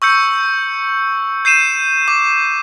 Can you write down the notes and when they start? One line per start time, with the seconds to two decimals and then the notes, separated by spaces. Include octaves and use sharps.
0.02 C#6 E6 G6 C#7
1.45 G6 C7 D#7 E7
2.08 D6